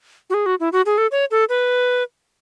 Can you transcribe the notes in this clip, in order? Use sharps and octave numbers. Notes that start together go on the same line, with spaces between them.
F#4
G#4
F#4
E4
F#4
G#4
A4
C#5
A4
B4